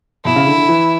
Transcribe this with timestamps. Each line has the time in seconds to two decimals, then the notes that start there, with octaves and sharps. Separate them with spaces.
0.25 B2 E4
0.36 C#3
0.47 D3
0.58 D3
0.68 E3